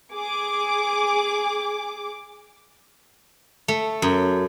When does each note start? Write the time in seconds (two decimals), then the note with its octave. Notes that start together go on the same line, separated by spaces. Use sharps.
0.13 G#4 D6
3.68 A3
4.02 F#2